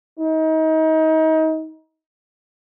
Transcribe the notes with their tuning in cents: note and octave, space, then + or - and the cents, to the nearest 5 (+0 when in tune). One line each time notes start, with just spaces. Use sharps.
D#4 +30